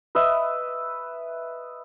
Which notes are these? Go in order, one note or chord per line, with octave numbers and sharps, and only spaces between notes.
B4 D#5 E5